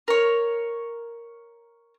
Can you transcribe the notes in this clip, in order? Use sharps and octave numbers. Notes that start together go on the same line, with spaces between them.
A#4 C#5